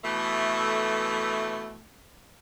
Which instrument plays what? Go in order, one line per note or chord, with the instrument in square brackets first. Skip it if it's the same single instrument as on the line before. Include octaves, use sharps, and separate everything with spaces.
[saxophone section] B2 E3 A3